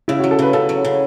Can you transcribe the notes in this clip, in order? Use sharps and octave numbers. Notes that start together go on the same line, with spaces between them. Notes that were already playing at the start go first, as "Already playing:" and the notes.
C#3 E4
F#3 F#4
A4
C#3 B4
C#3 A4
F#3
C#3